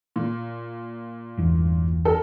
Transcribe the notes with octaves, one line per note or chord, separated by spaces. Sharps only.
A#2
G1 E2
A4 A#4